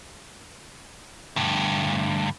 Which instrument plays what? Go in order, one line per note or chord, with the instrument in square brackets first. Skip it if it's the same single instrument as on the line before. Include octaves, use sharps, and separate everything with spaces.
[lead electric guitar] D2 G2